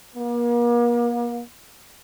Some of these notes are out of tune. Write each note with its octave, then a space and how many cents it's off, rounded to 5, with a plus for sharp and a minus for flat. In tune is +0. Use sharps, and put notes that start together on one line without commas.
A#3 +40